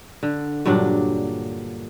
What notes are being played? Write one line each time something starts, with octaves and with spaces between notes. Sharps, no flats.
D3
G2 A#2 F#3 D4